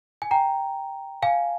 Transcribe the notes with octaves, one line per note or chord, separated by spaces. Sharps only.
G#5
G5 A#5
F5 G#5